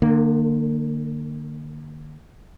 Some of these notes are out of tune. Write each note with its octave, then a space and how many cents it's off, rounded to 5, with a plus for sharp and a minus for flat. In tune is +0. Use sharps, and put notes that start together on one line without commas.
D3 +40 A#3 -15